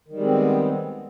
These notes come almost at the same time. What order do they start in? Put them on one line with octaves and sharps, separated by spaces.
D#3 G3 G#3 C4 B3